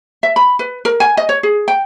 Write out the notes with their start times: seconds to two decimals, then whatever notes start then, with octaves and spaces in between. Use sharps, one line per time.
0.23 E5
0.36 B5
0.59 B4
0.85 A#4
1.00 G#5
1.17 D#5
1.29 C#5
1.43 G#4
1.68 G5